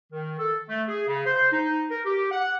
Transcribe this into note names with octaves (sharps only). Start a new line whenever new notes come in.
D#3
A4
A3
G#4
C#3
C5
D#4
A#4
G4
F#5